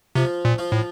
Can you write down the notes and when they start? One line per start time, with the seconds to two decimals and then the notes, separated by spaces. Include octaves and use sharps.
0.15 C3 F3 F4
0.45 A#2
0.58 F3 F4
0.72 A2